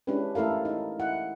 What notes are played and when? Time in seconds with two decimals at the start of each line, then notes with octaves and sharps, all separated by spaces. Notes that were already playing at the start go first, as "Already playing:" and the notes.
0.07 G#3 C#4 D4 E4 G4 B4
0.35 A3 E4 A4 A#4 F5
0.65 D#4 E4
0.99 E4 F#5